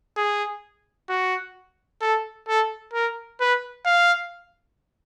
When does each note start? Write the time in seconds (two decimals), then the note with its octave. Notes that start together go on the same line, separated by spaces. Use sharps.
0.17 G#4
1.09 F#4
2.01 A4
2.48 A4
2.94 A#4
3.40 B4
3.86 F5